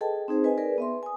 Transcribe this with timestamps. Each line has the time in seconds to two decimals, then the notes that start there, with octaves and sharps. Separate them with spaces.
0.01 G#4 A4 B4 D#5 G5 A5
0.28 C4 D#4 G#4 C5
0.44 B4 D#5 G#5
0.58 G#4 A#4 B4 D5
0.78 B3 E5 C6
1.03 G#5 D#6